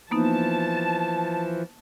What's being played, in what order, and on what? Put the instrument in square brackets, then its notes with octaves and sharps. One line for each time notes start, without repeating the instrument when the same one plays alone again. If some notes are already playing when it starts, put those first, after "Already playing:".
[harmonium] E3 F3 [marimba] A#3 B3 D#4 [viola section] A5